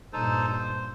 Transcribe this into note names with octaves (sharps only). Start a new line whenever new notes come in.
G2 A#2 D#4 A4 C5
C5